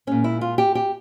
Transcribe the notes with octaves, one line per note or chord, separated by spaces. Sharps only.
A#2 G#3 C#4
E4
F4
G4
G4